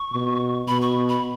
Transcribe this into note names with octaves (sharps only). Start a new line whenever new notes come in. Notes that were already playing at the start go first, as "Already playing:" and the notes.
Already playing: C#6
B2
B2 B5
C#6
B5